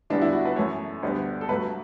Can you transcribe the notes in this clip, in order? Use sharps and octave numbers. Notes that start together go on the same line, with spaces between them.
E2 D3 G3 B3 D4
E4
F#4
B4
F#2 E3 A3 C#5
D2 D3 G3 B3
A4
G2 F#3 A3 B4